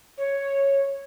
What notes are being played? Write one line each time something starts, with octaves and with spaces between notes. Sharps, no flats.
C#5